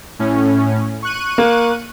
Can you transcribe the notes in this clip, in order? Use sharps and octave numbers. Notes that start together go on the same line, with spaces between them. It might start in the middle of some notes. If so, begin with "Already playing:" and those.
A2 C#4
C#6 F#6 D#7
A#3